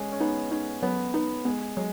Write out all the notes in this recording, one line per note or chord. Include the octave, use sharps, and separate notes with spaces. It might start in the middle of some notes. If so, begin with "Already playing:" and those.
Already playing: G#3 C#4
C#4
B3 D#4
C#4 D#4
F#3 B3
B3 D#4
G#3 B3
F#3 G#3